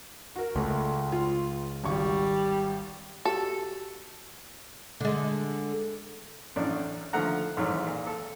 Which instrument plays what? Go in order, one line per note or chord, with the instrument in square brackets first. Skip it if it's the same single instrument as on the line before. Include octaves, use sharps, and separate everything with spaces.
[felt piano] F#4 A#4
[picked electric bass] C#2 [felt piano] A3
[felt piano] F4
[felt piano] G#1 C#6 [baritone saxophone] G3
[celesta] F#4 G4 [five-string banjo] A4
[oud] D3 G#3
[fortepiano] A1 F#2 A2 D4 D5
D3 D#3 F3 A3 F#5 A#5
A1 G#2 D#3 E3 F#3
A#2
A4